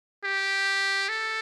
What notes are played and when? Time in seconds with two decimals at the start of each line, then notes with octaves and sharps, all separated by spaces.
0.24 G4
1.09 A4